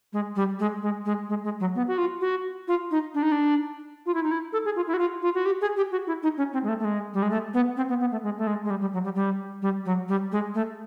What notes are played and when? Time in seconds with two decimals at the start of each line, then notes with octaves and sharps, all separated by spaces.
0.13 G#3
0.36 G3
0.59 G#3
0.82 G#3
1.05 G#3
1.29 G#3
1.44 G#3
1.60 F#3
1.75 B3
1.88 F#4
1.98 F4
2.21 F#4
2.68 F4
2.91 D#4
3.14 D4
3.22 D#4
3.32 D4
4.06 F4
4.14 E4
4.23 D#4
4.31 E4
4.53 A4
4.65 G#4
4.76 F4
4.87 E4
4.94 F#4
4.99 F4
5.22 F4
5.35 F#4
5.45 G4
5.61 G#4
5.77 G4
5.91 F#4
6.07 E4
6.23 D#4
6.38 C#4
6.53 C4
6.63 G#3
6.68 A3
6.79 A3
6.85 G#3
7.14 G3
7.22 G#3
7.30 A3
7.54 B3
7.77 C4
7.89 B3
8.00 B3
8.11 A3
8.23 G#3
8.38 A3
8.47 G#3
8.64 G#3
8.70 G3
8.81 G3
8.93 F#3
9.04 G3
9.15 G3
9.62 G3
9.85 F#3
10.08 G3
10.32 G#3
10.55 A3